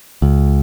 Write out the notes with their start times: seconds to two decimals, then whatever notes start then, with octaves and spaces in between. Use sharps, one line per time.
0.22 C#2